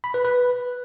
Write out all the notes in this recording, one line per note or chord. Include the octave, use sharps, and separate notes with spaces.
B5
B4
B4